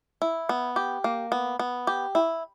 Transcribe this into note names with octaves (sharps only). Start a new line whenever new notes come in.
E4
B3
G4
A#3
B3
B3
G4
E4